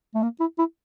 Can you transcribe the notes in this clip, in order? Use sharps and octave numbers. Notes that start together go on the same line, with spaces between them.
A3
A#3
E4
E4